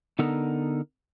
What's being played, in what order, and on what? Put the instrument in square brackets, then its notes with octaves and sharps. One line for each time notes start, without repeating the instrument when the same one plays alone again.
[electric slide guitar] D3 B3 D#4 A4 A#4